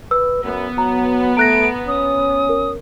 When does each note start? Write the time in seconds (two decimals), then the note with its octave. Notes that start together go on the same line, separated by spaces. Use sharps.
0.11 B4 E6
0.44 F#2 B3
0.78 F#3 A#5
1.37 A3 A#5 F#6 A#6 D7
1.88 C#4 D#6
2.49 A#4